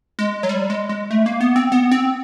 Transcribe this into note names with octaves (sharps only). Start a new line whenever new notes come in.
G#3
F#3
G3
G#3
G#3
A3
A#3
B3
C4
B3
C4